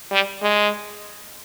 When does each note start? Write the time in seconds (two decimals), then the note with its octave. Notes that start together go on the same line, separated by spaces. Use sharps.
0.12 G3
0.42 G#3